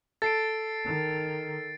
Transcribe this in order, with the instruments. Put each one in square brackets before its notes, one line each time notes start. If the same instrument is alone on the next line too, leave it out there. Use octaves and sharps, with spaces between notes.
[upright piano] A4 [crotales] A6 C7 D7
[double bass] D#3